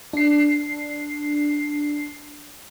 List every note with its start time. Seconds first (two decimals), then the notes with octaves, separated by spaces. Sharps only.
0.13 D4 C7